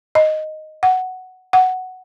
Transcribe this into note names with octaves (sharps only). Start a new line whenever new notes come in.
D#5
F#5
F#5